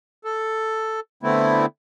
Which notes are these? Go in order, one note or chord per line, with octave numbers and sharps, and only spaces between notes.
A4
D3 A3 B3 C4 E4